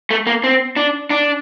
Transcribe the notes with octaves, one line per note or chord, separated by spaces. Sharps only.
A3
A#3
C4
D4
D4